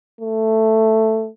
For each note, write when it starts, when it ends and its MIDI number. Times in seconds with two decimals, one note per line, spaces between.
0.21 1.28 57